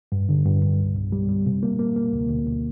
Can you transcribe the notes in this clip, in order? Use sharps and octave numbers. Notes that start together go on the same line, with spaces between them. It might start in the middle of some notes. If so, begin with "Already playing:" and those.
G2
D3
G2
G2
C2
C2
G3
G3
C3
A#3
A#3
A#3
D2
D2
D2